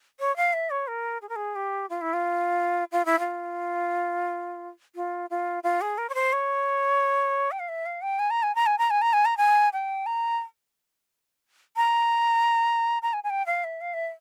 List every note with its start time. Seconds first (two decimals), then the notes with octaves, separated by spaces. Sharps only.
0.20 C#5
0.36 F5
0.53 E5
0.70 C#5
0.87 A#4
1.22 G#4
1.29 A#4
1.36 G#4
1.55 G4
1.90 F4
2.01 E4
2.13 F4
2.92 F4
3.05 E4
3.19 F4
4.95 F4
5.30 F4
5.63 F4
5.81 G#4
5.98 A#4
6.09 C#5
6.14 C5
6.33 C#5
7.51 G5
7.59 F5
7.68 E5
7.86 F5
8.02 G5
8.19 G#5
8.30 A#5
8.43 G#5
8.55 A#5
8.66 G#5
8.78 A#5
8.90 G#5
9.02 A#5
9.13 G#5
9.25 A#5
9.37 G#5
9.73 G5
10.06 A#5
11.77 A#5
13.02 A#5
13.13 G#5
13.24 G#5
13.30 G5
13.46 F5
13.64 E5
13.81 F5
13.94 E5